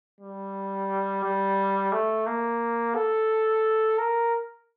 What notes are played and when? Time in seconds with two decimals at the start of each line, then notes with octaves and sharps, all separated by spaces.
0.21 G3
1.24 G3
1.92 A3
2.26 A#3
2.95 A4
3.98 A#4